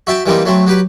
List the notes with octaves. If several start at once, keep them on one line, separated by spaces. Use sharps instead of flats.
F#4 E5 G5 A5
E3 G3 A#3 C4 D#4
F#3 A3 C4
F#3 G4 B4